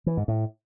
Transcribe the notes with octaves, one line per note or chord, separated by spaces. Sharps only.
E3
G#2
A2